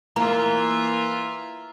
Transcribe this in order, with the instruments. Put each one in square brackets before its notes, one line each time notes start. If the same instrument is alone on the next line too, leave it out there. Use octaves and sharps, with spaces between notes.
[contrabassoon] E3 [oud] A#3 [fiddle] F4 E5 [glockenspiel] A#5